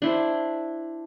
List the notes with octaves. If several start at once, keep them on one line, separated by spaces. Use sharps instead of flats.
D4 E4 C5